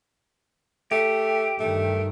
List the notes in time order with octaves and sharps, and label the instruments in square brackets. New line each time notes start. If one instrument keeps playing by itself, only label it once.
[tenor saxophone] A3 [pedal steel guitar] G4
[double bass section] G2 D#3 [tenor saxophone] A3